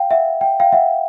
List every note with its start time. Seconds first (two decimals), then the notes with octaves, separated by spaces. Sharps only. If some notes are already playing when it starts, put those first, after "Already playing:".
Already playing: F5 G5
0.11 E5 F#5
0.41 G5
0.60 F5 G5
0.72 E5 F#5